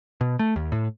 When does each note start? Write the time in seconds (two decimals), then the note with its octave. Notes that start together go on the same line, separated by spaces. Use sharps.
0.21 B2
0.39 A3
0.56 D#2
0.72 A2